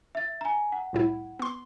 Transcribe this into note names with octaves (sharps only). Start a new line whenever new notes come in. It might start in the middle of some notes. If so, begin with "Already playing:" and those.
E5 A6
G#5 A#5
F#5
C2 A2 E4
B3 C6